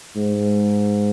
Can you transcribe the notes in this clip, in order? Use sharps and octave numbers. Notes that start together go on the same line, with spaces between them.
G#2